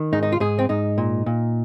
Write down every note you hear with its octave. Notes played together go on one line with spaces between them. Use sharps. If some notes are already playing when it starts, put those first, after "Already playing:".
Already playing: D#3
G#2 D#4
D#4
F4
G#2 G#4
C4
G#2 D#4
A#2
A#2